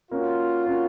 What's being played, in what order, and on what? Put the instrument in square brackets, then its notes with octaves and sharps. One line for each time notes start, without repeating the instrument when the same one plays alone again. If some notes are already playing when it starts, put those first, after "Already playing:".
[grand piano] A#3 C#4 F#4 [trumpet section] F4
[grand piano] A#3 C#4 F#4